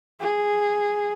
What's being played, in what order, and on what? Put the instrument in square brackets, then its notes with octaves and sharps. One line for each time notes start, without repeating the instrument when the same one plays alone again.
[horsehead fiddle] G#4